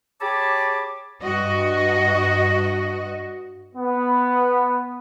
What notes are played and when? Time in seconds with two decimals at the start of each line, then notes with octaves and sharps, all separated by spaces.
0.21 G4 G#4 C#5 A5 B5 D6
1.21 G2 F#4 D#5
3.75 B3